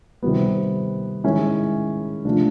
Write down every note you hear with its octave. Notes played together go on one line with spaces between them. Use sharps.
C3 D#3 G3 B3
D#3 G#3 C#4 E4
C3 F3 A3 D4